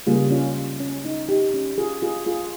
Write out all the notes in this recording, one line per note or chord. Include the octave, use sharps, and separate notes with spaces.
C#3 G3 A#3 C#4 F4 G#4
C#4 F4
C#4
D#4
D#4 G4
C#4
F4 G#4
F4 G#4
F4 G#4